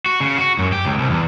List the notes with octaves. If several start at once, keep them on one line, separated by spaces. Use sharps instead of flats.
F#4
C#3
F#4
F#2
G4
C#2
C2
E2